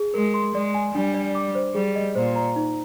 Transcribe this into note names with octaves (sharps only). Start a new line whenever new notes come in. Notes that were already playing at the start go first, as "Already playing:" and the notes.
Already playing: G#4
G#3 A#4
C6
G#3 D5
G#5
G3 D4
D5
D6
C5
G3 G#4
D#5
A#2 C5
A#5
D#4